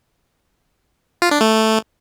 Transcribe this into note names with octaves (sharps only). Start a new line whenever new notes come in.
F4
D4
A3